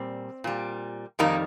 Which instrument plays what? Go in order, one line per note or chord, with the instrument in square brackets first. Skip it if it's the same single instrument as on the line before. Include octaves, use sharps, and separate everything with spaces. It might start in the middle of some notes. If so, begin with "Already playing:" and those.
Already playing: [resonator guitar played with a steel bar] A#2 G3 C4
A#2 G3
F2 D#3 G3 A#3 D#4